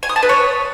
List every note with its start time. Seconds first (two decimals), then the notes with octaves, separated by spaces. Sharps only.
0.03 G#5
0.09 D#6
0.16 A5
0.23 B4
0.29 C#5